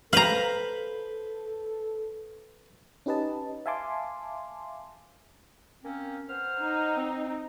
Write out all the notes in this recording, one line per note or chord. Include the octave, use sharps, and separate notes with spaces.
A4 B4 C5 F5 A#5 B5
C#4 D#4 G4 B4 D#5 A5
E5 F5 G#5 A5 C6 D6
A#3 C4 C#4
B3 C5 F6
D#4
C4